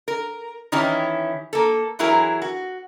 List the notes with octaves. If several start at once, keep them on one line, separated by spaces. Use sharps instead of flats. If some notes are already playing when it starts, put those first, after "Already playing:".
A#4
D#3 E3 C#4 E4 G4
A#3 A4
E3 F#3 E4 G#4 A#4
F#4